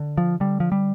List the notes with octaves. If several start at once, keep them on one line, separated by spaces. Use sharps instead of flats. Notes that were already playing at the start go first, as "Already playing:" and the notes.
Already playing: D3
F3
D3 G3
F3
G3